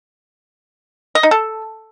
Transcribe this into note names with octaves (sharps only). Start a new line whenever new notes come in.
D#5
D#4
A4